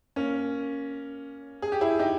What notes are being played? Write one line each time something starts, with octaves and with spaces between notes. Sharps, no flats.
A#3 C#4
G#4
G4
E4 G#4
D#4 G4